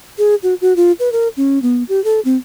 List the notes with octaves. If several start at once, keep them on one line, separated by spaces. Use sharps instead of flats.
G#4
F#4
F#4
F4
B4
A#4
C#4
B3
G4
A4
C4